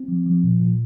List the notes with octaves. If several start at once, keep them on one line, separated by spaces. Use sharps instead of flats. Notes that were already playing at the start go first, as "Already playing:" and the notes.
Already playing: C4
F3
F3
A#2
A#2